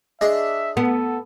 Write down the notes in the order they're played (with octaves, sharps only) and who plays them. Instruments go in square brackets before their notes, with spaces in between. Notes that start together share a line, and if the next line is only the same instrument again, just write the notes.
[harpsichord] D4 G#4 C6 [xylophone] D#5 [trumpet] E5
[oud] B3 [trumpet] A4